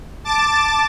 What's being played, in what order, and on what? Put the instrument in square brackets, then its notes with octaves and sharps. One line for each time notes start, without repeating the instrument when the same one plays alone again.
[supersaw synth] A5 D6 A6